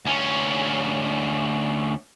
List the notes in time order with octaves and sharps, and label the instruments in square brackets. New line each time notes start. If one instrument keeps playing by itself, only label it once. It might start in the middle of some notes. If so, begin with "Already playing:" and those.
[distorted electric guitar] D2 C#4